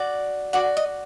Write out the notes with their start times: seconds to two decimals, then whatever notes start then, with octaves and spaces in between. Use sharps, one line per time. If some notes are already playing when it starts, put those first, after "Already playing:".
Already playing: F#4 D5
0.53 F#4 D5 F#5
0.77 D#5